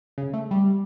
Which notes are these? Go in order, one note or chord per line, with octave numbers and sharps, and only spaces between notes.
C#3
A3
G3